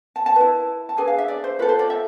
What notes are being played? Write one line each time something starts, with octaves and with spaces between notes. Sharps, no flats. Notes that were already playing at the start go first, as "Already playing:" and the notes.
A5
A5
E4 B4
A5
D4 G#4 B4 G#5
F5
E5
D5
C5
F4 A4 B4
C5
D5
E5